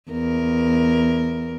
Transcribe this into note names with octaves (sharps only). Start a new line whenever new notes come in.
E2 A#4